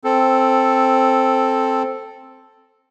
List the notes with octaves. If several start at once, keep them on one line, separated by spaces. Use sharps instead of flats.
C4 A4